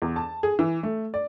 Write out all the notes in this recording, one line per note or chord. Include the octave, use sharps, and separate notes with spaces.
E2
A5
G#4
E3
A3
D5